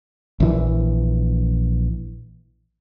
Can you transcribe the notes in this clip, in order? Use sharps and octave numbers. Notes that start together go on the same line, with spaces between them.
A#1 E3